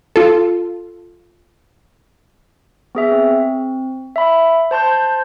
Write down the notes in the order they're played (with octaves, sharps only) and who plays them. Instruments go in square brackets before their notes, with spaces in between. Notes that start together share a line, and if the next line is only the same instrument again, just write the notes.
[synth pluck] F4 A4
[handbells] B3 G#4 E5
C4
E5 B5
C5 A5 C6 G6